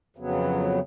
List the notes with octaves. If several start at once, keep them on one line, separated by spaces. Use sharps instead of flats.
F2 C#3 F#3 B3